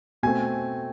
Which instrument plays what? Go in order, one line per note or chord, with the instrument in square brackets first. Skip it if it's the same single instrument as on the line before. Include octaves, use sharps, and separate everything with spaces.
[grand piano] B2 A3 C4 G#5